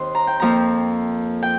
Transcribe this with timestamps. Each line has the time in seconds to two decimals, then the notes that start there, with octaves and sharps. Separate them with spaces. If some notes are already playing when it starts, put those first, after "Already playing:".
Already playing: D#2 D#3 C4 C6
0.15 A#5
0.27 G5
0.40 F2 F3 A#3 A#5
1.43 G5